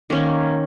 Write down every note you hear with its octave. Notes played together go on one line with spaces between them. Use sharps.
D#3 A#3 C#4